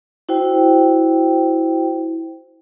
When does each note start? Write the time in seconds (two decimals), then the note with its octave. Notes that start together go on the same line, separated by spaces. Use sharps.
0.29 E4 F#4 C5 G5